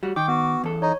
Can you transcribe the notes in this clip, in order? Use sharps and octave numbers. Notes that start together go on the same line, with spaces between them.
G3 F#4
D#3 G5 D6
B3 F#4
E2 A4
D#4 C#5